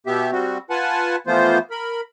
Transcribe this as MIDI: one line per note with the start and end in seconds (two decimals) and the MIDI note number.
0.07 0.31 47
0.07 0.31 59
0.07 0.31 67
0.07 0.31 76
0.32 0.58 55
0.32 0.58 60
0.32 0.58 66
0.70 1.16 65
0.70 1.16 71
0.70 1.16 78
0.70 1.16 80
0.70 1.16 81
1.27 1.58 52
1.27 1.58 53
1.27 1.58 57
1.27 1.58 59
1.27 1.58 65
1.27 1.58 72
1.71 2.01 70
1.71 2.01 83